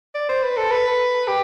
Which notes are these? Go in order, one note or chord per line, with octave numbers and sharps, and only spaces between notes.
D5
C5
B4
A4
B4
G4